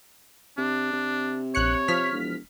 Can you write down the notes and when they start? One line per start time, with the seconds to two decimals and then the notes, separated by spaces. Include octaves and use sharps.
0.58 C3 D4
0.93 C3
1.55 A#1 C#5 F#6 C#7
1.88 F3 F6 B6
2.12 E1